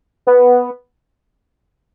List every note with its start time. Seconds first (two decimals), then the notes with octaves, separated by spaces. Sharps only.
0.27 B3